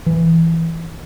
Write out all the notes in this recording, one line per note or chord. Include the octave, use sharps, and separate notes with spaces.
E3